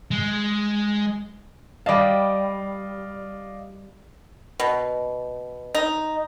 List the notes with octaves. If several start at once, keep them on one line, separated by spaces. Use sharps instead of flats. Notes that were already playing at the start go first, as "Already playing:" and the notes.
G#3
G3 D5 D#5 F5 A5
B2
D#4